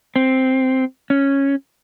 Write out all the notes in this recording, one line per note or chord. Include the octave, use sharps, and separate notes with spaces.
C4
C#4